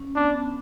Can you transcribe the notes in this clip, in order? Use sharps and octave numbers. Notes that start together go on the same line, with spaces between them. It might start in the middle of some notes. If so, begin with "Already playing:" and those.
Already playing: C#4
B3 D4